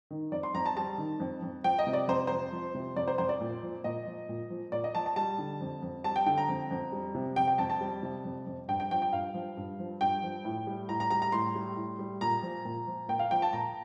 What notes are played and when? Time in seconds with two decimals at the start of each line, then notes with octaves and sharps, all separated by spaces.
0.10 D#3
0.32 F2 D5
0.43 C6
0.54 F2 A#5
0.66 A5
0.77 G3 A5
0.98 D#3
1.20 F2
1.42 F2
1.64 F3 G5
1.79 D#5
1.87 C3
1.93 D5
2.08 F2 C5
2.27 F2 C5
2.52 F3
2.74 C3
2.96 F2 D5
3.08 C5
3.18 F2 C5
3.29 D5
3.41 A#2
3.63 F3
3.84 A#2 D#5
4.06 F3
4.29 A#2
4.50 F3
4.72 A#2 D5
4.84 D#5
4.95 F3 A5
5.06 A5
5.16 G3 A5
5.39 D3
5.61 F2
5.82 F2
6.04 G3 A5
6.16 G5
6.26 D3 G5
6.37 A#5
6.48 F2
6.71 F2
6.92 G3
7.14 C3
7.36 F2 G5
7.48 G5
7.58 F2 A5
7.70 A5
7.81 G3
8.03 C3
8.25 F2
8.47 F2
8.68 G2 G5
8.80 G5
8.91 F3 G5
9.02 G5
9.13 G2 F5
9.34 F3
9.57 G2
9.79 F3
10.01 G2 G5
10.23 F3
10.45 A2
10.67 G3
10.89 A2 A#5
11.00 A#5
11.10 G3 A#5
11.22 A#5
11.32 A2 C6
11.55 G3
11.77 A2
11.99 G3
12.21 A#2 A#5
12.43 F3
12.65 A#2
12.87 F3
13.09 A#2 G5
13.19 F5
13.31 F3 G5
13.42 A5
13.53 A#2 A#5